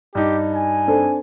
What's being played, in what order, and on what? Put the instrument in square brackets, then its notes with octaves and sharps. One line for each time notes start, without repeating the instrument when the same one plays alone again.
[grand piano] G2 D#4 [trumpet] G4
[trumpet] G#5
[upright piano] C4 D4 A4